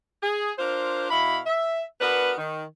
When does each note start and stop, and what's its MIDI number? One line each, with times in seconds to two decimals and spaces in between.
0.23 0.52 68
0.58 1.08 62
0.58 1.08 65
0.58 1.08 70
0.58 1.08 72
1.10 1.39 47
1.10 1.39 64
1.10 1.39 77
1.10 1.39 83
1.46 1.80 76
2.01 2.32 59
2.01 2.32 62
2.01 2.32 66
2.01 2.32 70
2.01 2.32 71
2.36 2.63 51